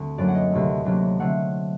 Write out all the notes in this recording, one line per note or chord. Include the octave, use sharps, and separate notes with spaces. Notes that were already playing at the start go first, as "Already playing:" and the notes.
Already playing: D2 D3 C4
F#2 F#3 A#3 D4 D5
F#5
D#5
D2 C3 D#3 A3
D2 C3 F#3 A#3 D4
D3 F#3 A3 C4 F#5